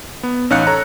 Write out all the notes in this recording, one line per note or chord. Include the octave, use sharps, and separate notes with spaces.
B3
A1 C#4 D#4 F5 F#6 C#7
A4 C#5 A#5